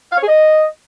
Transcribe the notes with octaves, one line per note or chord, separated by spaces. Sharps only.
F5
C#5
G#4
D#5